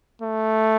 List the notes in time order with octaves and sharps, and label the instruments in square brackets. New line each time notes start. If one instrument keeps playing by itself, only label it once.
[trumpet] A3